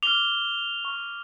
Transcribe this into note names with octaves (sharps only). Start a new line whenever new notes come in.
D6 F6 F7 G7
C#6 F6